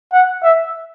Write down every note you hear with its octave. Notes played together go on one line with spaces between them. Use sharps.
F#5
E5